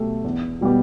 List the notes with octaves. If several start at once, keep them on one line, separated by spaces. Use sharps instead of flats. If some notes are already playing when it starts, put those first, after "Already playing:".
Already playing: B2 A3 G4
E2
B2 G3 B3 G4